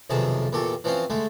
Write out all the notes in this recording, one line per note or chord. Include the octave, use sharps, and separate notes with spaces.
B1 F2 C3 D#3 G#4 A5
E2 A#2 G4 A4 C#6
E3 F3 C4 C#4 F4
D3 G#3 A3